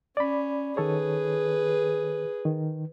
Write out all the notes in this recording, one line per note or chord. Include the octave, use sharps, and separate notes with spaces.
C#4 D5 B5
D#3 G#4 A4 B4 C#5
D#3